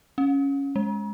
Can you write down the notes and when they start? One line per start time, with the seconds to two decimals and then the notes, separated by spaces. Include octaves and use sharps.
0.18 C#4
0.76 G#3